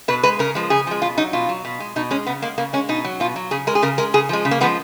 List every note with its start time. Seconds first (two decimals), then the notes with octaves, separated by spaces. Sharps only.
0.08 B2 B4
0.23 G#3 B4
0.39 C#3 A#4
0.55 F3 G#3
0.70 C#3 G#4
0.87 F3 G#3
1.02 B2 F4
1.17 F#3 D#4
1.33 B2 F4
1.49 F#3
1.65 B2
1.80 G#3
1.96 B2 D#4
2.11 G#3 C#4
2.26 C#3 B3
2.42 G#3 A#3
2.58 C#3 A#3
2.73 G#3 C#4
2.89 B2 D#4
3.05 F#3
3.20 B2 F4
3.36 F#3
3.51 C#3 G#4
3.67 G#3 A#4
3.75 G#4
3.82 C#3 A#4
3.98 G#3 A#4
4.14 C#3 G#4
4.29 F3 G#3
4.45 C#3
4.51 A#3
4.61 F3 G#3 B3